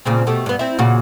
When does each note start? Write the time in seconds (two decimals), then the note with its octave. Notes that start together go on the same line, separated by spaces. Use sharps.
0.05 A#2 C#3 C4
0.27 B2 A3 G4
0.46 G2 B3
0.59 C4 E4
0.79 A#2 C#3 F#4